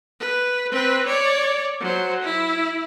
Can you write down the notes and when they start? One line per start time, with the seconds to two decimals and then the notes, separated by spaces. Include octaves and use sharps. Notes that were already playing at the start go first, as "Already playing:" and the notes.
0.20 B4
0.71 C4 B4
1.06 C#5 D5
1.80 F#3 C5
2.22 E4